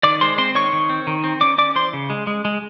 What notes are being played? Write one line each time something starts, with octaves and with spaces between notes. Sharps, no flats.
D#3 D5 D6
G#3 C5 C6
C4 C5 C6
D#3 C#5 C#6
D#3
C4
D#3
C4
C#4 D5 D6
C#4 D5 D6
E3 C5 C6
C#3
G#3
G#3
G#3